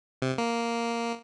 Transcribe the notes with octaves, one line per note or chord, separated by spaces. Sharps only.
C3
A#3